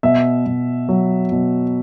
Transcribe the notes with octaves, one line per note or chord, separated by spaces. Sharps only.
B2 E5
B2
F#3
B2